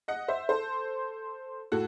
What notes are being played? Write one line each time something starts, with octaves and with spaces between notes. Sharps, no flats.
D#5 F#5
C5 E5
A4 C5
A2 F#4 A4